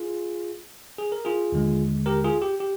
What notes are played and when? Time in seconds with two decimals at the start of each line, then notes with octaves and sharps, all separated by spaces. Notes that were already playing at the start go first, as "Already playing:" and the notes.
Already playing: F4 G#4
0.98 G#4
1.12 A#4
1.25 F4 G#4
1.52 D#2 D3 G#3
2.06 G4 A#4
2.24 F4 G#4
2.42 G4
2.60 G4